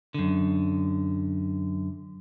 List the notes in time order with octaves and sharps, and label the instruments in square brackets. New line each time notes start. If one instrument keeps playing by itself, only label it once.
[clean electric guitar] F#2 D3